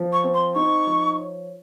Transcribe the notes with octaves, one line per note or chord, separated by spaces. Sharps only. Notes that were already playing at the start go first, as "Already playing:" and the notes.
Already playing: F3
C#6
C4
C6
D#4 C#6
F3
C#5